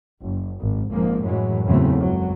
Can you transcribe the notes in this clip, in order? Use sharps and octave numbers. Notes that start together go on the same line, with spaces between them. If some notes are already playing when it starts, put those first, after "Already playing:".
F#1
G#1
G#1 G#2 F3 G#3 A#3
F#2 A2 E3 F#3 G#3
E2 C#3 E3 F#3 A3 C4
F#1 C#2 F#2 F#3